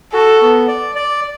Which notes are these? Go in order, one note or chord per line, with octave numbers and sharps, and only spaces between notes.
F#4 A4
B3
D5
D5